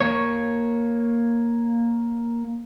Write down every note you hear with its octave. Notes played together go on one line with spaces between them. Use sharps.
A#3 C#5